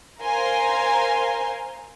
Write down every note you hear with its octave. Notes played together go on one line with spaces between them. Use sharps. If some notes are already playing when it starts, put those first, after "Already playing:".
A#4 C5 F5 G#5 A#5 C6